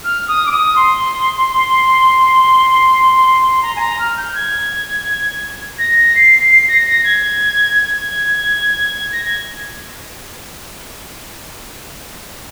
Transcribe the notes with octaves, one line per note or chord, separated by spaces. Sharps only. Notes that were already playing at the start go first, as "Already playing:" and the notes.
F6
D#6
D6
D#6
C6
A#5
G#5
A#5
F6
G6
G#6
A#6
C7
C7
A#6
A#6
G#6
G#6
A#6
G#6